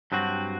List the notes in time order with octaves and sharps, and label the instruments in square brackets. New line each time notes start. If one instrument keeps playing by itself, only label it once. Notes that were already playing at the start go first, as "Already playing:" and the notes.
[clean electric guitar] G2 F#3 C4 F#4